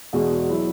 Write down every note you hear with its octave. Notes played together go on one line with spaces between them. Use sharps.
E2 B2 G#3
F#3 E4